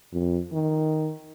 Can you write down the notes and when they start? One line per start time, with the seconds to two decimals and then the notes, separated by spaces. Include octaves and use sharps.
0.13 F2
0.52 D#3